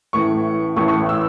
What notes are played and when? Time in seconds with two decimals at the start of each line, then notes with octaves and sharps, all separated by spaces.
0.13 A1 A2 E3 C#6
0.76 A1 A2 E3 A3 C#6
0.88 C#6
1.09 E6